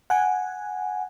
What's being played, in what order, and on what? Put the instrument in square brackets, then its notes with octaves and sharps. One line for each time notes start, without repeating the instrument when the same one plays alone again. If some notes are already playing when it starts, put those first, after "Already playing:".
[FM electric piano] F#5 G#5